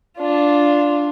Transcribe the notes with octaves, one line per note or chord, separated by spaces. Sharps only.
D4 F4